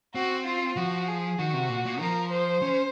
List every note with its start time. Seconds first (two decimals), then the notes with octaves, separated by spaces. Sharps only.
0.15 C4 F#4
0.46 F4
0.77 F3 F#4
1.08 G#4
1.38 D#3 F#4
1.54 C3
1.69 A#2
1.86 A#2
2.00 F3 A#4
2.32 C5
2.62 C#4